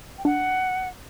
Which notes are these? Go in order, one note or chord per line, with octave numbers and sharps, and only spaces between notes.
G5
D4 F#5